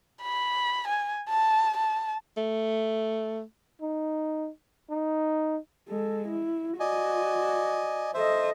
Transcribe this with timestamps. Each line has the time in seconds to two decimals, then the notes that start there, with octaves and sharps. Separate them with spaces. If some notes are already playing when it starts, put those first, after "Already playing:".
0.22 B5
0.88 G#5
1.29 A5
1.77 A5
2.37 A3
3.82 D#4
4.90 D#4
5.88 G#3 A4
6.28 E4
6.80 F#4 D5 D#5 G#5
8.14 A4 C5 D#5 E5